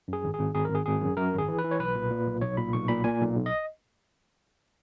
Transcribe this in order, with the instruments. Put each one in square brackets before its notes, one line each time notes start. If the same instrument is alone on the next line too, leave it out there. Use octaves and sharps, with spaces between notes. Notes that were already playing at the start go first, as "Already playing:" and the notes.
[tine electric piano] F#2 G#4
G#1
G#4
G#1
G#1 G#4
A#4
G#1 G#4
G#1 G#4
F#2
F#2 A#4
G#1
G#4
E3
B4
E3
C#5
B1 B4
A#2
A#2
B1
B1 C#5
A#2 B5
B1 C#6
A#2 B5
A#2 G#5
B1
B1
D#5